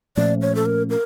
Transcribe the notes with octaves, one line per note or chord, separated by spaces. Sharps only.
A#2 F3 A3 C#4 D5
C#5
A4
A#4
A#4